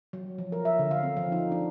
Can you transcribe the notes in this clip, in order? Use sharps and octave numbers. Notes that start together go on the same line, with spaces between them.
F#3
F3
A#4
E5
D3
F5
C4
F3
D#4
D4